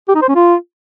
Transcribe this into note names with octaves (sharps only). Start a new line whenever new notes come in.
G4
D#4
C5
C#4
F4